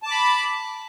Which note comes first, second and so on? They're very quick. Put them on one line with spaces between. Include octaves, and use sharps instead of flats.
A5 D6 B5